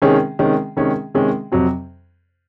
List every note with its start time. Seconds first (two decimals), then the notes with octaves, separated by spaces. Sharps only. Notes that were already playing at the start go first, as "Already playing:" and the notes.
0.02 C3 D#3 G#3 C#4 G#4
0.39 C3 D#3 G#3 C#4 G#4
0.77 C3 D#3 G#3 C#4 G#4
1.14 C3 D#3 G#3 C#4 G#4
1.52 F2 C3 F#3 C4